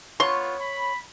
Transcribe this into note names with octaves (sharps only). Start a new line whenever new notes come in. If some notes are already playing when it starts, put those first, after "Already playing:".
B3 F4 C#5 C6
B5